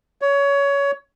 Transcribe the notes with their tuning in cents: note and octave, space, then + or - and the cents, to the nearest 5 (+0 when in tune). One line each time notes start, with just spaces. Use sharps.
C#5 +20